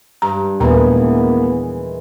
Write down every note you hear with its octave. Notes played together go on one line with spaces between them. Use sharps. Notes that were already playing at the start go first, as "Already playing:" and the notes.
G2 A#5
D#2 A#2 D#3 E3 G#3 A#3 B3 A#5